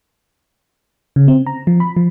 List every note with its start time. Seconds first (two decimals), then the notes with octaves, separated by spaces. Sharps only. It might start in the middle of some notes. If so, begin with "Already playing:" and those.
1.16 C#3
1.28 C4
1.47 A#5
1.67 F3
1.80 B5
1.96 F3